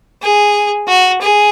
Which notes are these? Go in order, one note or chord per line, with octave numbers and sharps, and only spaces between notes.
G#4
F#4
G#4